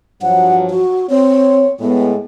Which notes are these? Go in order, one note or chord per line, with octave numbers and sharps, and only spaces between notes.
G2 F3 F#3 F#5
F#4
C4 C#5
A2 G#3 B3